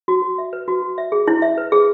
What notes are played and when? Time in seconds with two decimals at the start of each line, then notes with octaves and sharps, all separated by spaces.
0.08 F#4
0.22 F#4
0.38 E5
0.53 B4
0.68 F#4
0.82 F#4
0.98 E5
1.12 G#4
1.28 E4
1.42 E5
1.58 B4
1.72 G#4